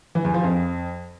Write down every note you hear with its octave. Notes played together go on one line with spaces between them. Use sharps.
E3
E2
F3
F2